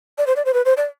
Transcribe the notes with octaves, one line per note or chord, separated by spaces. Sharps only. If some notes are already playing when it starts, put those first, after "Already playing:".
D5
C5
D5
C5
B4
C5
D5